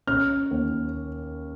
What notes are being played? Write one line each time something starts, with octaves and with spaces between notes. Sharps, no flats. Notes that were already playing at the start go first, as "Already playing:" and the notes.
C#4 F6
D#2